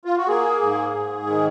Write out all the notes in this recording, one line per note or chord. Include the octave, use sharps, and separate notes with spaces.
F4
F#4
A#3 G#4
G#2
G#2
D#3